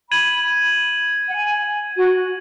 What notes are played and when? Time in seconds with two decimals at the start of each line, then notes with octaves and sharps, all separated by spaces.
0.11 B5 G#6 D#7 F#7
1.29 F#5
1.35 G#5
1.97 F#4